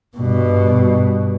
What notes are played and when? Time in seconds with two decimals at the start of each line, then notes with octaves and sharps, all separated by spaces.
0.17 G2 B2